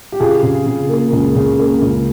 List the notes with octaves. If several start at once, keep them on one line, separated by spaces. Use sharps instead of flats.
G4
C#3 F4 G#4
C#3
C#3
A#3
C#2
C#3
A#3
C#2